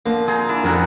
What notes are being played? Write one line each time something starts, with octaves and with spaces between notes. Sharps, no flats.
D3 F3 A#3
C4 G#4 A#5
D4 E4 A#5
F2 A#3 C#4 D4 F#4 A4 A#4